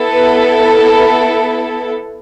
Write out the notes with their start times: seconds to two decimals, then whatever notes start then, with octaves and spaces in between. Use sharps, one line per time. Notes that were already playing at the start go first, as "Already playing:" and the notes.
Already playing: B3 E4 A4
0.12 B4